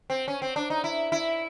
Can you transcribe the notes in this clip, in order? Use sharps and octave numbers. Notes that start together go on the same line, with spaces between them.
C4
C#4
C4
D4
D#4
E4
E4